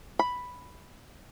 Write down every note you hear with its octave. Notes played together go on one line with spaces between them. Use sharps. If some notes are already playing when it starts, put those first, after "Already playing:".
B5